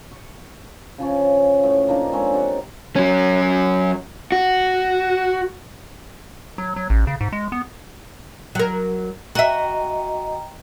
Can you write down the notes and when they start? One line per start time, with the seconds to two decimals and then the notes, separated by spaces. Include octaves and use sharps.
0.11 C#6
0.98 C#3 F3 C#4
1.64 A2
1.88 F3 A#3 D4 D#4
2.12 G#3 C4 C#4
2.33 D#4 G4 D5 F#5
2.96 F#3 C#4
4.32 F#4
6.58 F#3
6.76 F#3
6.90 A1
7.07 C#3
7.21 G#2
7.33 G#3
7.52 B3
8.55 F#3 A#4
9.35 F#4 D#5 E5 G5 A#5